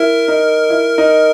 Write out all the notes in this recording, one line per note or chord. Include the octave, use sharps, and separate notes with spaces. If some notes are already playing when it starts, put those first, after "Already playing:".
Already playing: E4 A#4
D#4
E4
D#4